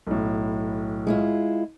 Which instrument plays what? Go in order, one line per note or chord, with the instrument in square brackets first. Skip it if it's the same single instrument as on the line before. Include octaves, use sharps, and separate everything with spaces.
[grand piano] B1 A2
[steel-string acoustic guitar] G#3 E4 F4